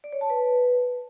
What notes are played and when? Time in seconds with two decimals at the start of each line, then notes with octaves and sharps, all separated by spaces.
0.04 D5
0.13 C#5
0.21 A5
0.30 B4